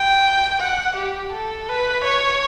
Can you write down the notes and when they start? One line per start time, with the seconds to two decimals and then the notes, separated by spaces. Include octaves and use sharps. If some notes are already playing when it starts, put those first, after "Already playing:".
Already playing: G5
0.60 F#5
0.96 G4
1.32 A4
1.68 B4
2.05 C#5